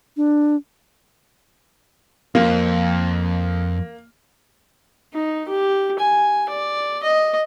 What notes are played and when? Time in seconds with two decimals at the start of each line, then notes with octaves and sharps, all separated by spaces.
0.17 D4
2.35 F2 A#3
5.14 D#4
5.48 G4
5.99 G#5
6.49 D5
7.03 D#5